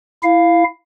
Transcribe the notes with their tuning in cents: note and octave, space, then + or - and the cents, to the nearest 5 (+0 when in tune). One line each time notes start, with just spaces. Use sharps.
E4 +10 F5 +0